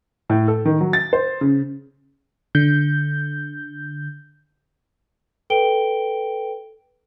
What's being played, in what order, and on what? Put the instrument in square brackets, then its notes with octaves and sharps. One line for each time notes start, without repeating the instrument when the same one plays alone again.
[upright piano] A2
A4
D#3
F#3
A6
C5
C#3
[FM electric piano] D3 G6
[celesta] A4 B4 G5 D7 G7